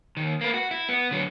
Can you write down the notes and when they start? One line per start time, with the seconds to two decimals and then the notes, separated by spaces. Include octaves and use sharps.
0.17 D#2 D#3
0.41 A#3 B4
0.54 F#4
0.71 E4
0.89 B3
1.11 D3 F#3